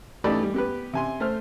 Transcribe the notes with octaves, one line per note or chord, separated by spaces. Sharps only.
E3 A3 D#4 G4 D5 B5
G3
B3 G4 B4
C3 G#5 C6
A3 C5 F6